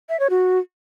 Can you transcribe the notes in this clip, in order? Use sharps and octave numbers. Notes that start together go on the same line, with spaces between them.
E5
C#5
F#4